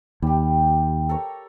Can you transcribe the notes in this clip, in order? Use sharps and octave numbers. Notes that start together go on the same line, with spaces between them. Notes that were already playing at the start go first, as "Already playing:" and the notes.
D#2 G3 G4
A4 A#4 C#5